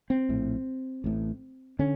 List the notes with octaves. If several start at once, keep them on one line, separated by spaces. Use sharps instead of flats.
C4
A#1 A2
A1 A2
D3 C#4